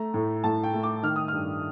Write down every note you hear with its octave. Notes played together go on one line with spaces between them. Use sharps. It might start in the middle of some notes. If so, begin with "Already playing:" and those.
Already playing: A3 A#5
A2
A2 A5
G5
A3
D6
D#3 F6
D#6
G2 F6